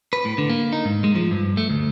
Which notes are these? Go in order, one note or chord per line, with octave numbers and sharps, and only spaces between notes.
B4
A2
D3
A#3
D#4
G#2
G#3
F3
G2
A3
D2